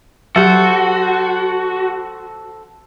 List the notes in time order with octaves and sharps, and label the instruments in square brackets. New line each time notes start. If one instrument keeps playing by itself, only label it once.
[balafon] F#3 G4 [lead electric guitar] F#4 [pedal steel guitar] A4 C5